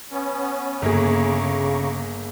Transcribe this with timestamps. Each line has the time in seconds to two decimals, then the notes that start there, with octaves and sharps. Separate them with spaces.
0.11 B3 C#4
0.82 G1 C#3 A#3 G#4 A#5 C#6 D6